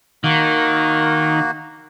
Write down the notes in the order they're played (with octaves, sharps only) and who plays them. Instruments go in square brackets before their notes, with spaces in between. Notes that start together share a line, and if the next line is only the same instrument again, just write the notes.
[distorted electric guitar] D#3 [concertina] A#3 F#4